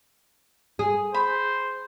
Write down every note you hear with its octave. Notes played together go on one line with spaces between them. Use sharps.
G#4
C5 B5